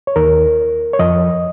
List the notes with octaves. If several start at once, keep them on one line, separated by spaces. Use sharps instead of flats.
C#5
D#2 D#3 A#4
C#5
F2 F3 D#5